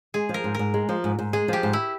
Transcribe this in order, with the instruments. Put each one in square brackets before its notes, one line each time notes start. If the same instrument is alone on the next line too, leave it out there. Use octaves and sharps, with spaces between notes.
[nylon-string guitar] G#3 [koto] G#4
[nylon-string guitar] F3
[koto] A#4
[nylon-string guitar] G#2
[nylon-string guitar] G#2 [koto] A#4
[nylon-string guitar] G#3
F3
G#2
G#2
[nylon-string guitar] G#3 [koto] G#4
[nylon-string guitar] F3 [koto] G4
[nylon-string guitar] G#2
[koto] E4